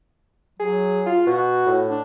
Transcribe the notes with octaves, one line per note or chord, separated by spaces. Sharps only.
F#3 G#4
F4
B2 F#4
A2
D4